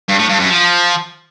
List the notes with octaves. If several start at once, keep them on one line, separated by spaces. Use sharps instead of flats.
G2
A2
G2
F#2
F3